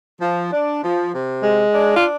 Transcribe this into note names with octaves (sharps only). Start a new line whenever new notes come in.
F3
D4
F3
C3
G#3
D4
F4